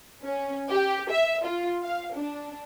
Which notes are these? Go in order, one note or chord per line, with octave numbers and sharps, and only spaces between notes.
C#4
G4
E5
F4
F5
D4